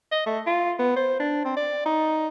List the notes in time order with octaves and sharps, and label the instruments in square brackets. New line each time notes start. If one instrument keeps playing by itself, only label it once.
[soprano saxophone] D#5
A3
F4
B3
C5
D4
C4
D5
D#4